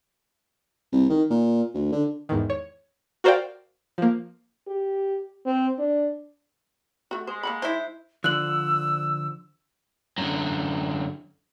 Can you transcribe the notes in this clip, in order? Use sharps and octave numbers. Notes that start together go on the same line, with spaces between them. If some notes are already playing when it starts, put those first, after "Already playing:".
C2
D#3
A#2
D2
D3
E2 G#2 D#3
C#5
F#4 A#4 C5 D5 F5 G5
F3 A#3
G4
C4
D4
A3 F#4
G#3 C5
A#3 F#5 B5
D#4 E4 C5
D3 F3 E6 F#6 F#7
F#2 D3